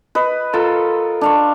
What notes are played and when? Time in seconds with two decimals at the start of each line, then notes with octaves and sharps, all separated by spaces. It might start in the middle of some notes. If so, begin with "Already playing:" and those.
0.15 B4 D#5
0.54 F4 A4 A#4
1.21 D4 F5 C#6